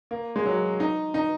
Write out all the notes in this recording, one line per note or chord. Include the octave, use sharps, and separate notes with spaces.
A#3
G#3
F#3
D#4
D#4